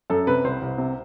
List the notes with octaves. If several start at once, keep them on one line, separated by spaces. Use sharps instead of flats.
F#2 A4
C3 B4
C2 C5
C2
C3